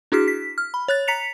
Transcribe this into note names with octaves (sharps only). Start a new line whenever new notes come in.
D4 E4 F#4 G#4 F6 B6
B6
F6
B5
C#5 F#6 A6
A#5 B6 C#7 F7